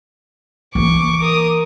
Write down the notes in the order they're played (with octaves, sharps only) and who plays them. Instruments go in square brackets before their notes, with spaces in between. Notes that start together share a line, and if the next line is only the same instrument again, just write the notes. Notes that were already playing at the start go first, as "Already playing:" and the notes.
[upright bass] E3 A#3 [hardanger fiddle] C#6 [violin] D6
[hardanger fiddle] A#4 D#6